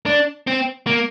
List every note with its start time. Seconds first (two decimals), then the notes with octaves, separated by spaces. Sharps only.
0.06 D4
0.47 C4
0.87 A#3